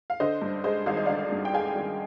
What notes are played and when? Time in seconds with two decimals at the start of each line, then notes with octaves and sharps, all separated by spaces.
0.10 F5
0.20 D3 C5 D#5
0.42 G2
0.64 G#3 C5 D#5
0.86 G#1 F5
0.97 D#5
1.06 D3 D5 F5
1.32 G2
1.45 G5
1.54 G#3 F5 G#5
1.76 G#1